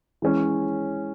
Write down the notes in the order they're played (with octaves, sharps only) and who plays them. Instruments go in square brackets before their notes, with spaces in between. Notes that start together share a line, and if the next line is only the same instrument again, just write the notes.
[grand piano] E3 G#3 C#4